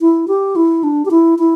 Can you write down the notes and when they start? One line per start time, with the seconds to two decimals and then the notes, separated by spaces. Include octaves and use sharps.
0.01 E4
0.28 G4
0.56 E4
0.83 D4
1.05 G4
1.11 E4
1.38 E4